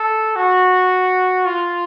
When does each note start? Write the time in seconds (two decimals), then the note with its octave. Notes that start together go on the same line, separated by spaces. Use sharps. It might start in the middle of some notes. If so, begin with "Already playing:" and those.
Already playing: A4
0.36 F#4
1.46 F4